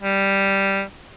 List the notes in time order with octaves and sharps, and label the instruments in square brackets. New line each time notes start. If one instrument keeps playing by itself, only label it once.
[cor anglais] G3